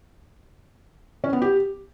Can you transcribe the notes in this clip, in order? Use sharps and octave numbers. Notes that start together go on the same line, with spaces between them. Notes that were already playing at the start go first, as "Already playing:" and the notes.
C#4
B3
G4